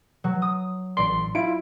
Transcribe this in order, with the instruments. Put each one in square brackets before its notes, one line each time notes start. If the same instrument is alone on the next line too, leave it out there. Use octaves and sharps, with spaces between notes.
[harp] F#3
D#6
[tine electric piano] A1 C6 [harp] D5
[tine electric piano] E4 F4 [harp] D7